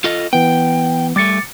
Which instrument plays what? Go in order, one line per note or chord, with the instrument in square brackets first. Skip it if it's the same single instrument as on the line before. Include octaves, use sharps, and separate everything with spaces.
[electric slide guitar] F4 A4 D#5
[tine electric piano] E3 B3 [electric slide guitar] G5
[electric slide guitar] G3 A3 [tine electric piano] D6 A6 C#7